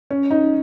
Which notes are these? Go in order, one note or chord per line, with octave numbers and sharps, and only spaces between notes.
C#4
D#4